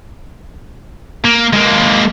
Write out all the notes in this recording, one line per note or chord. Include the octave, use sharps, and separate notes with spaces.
A#3
G#3 A#3